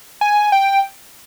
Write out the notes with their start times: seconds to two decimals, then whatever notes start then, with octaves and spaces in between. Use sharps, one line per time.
0.21 G#5
0.52 G5